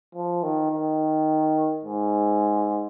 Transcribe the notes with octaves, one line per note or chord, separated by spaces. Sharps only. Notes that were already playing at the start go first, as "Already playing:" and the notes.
F3
D#3
D#3
G#2